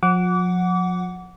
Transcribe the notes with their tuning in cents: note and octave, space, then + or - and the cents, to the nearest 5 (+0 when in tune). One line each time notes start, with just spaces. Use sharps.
F3 +45 F#5 +0 D6 -30